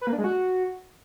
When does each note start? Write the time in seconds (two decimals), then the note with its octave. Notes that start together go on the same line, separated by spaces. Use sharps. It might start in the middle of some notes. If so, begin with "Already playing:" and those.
0.01 B4
0.07 A#3
0.13 D4
0.18 G#3
0.24 F#4